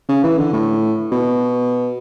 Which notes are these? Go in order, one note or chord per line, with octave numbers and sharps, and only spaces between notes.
C#3
E3
D3
A2
B2